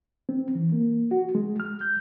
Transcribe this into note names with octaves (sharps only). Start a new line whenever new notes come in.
C4
E3
A#3
F#4
G#3
F6
G6